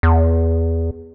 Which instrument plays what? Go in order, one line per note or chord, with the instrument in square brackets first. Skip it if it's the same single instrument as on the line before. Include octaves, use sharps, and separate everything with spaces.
[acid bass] E2